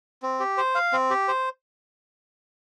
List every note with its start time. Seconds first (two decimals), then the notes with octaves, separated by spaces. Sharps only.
0.22 C4
0.40 G4
0.57 C5
0.75 F5
0.93 C4
1.10 G4
1.28 C5